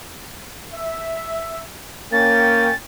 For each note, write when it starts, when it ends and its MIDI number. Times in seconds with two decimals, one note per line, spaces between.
0.74 1.62 76
2.12 2.70 58
2.12 2.74 61
2.12 2.74 79
2.12 2.75 93